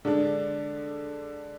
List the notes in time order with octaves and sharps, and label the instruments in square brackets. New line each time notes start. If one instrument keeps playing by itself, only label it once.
[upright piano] D3 G#3 D4